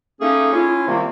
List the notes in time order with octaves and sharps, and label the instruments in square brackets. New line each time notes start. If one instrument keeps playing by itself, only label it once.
[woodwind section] A3 A#3 C#4 D#4 G#4
C#4 E4 F4
C3 D#3 G3 A#3